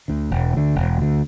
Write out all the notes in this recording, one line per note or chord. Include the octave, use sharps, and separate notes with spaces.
D2 D3
E1
D2 D3
E1
D2 D3